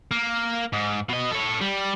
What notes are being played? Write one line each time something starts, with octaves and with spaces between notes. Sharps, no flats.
A#3
G#2
B2 D#5
A4 C#5
G3